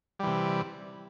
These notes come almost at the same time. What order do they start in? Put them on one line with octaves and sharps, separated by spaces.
G3 E3 C3